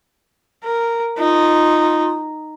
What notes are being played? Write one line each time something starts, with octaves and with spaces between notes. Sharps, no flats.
A#4
D#4 F4